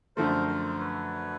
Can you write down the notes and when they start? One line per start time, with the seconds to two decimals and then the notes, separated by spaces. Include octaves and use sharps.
0.16 F#2 D3 F3 A3 A#4 C5
0.48 A#4 C5
0.79 B4 C#5